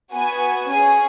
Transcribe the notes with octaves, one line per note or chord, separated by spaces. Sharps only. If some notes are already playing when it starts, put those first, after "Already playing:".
B3 F#4 G#5
C#4 G#4 G#5